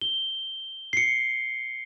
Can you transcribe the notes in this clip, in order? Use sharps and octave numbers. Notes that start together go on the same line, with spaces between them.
G7
C7 C#7